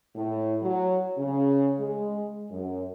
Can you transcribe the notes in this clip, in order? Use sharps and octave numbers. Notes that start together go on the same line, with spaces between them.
A2
F#3
C#3
G#3
F#2